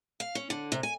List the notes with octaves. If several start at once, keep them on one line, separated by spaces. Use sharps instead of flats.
F5
C#4
D3
C3
G#5